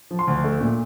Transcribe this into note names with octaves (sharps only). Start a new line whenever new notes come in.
F3
C6
D2
A3
A#2